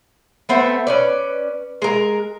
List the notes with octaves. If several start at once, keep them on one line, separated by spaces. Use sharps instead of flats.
A3 B3 C4
C#4 B4 D5
G#3 A#4